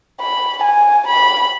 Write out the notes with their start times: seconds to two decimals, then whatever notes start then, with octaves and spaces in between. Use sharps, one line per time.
0.21 B5
0.63 G#5
1.07 B5